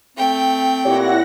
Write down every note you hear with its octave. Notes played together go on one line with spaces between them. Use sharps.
A3 C4 G5
A#2 E4 G4 C#5 F#5 A#6